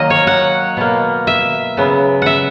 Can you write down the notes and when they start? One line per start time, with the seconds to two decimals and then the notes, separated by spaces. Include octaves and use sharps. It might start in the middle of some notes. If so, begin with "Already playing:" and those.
Already playing: D#3 F#3 A#3 D#5
0.10 C#5
0.27 F#5
0.77 B2 A#3
1.27 E5
1.77 C#3 F#3 B3
2.22 E5 F#5